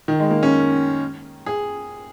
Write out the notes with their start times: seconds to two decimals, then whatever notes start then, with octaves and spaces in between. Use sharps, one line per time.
0.08 D#3
0.19 G#3
0.31 A#3
0.43 C#4
1.46 G#4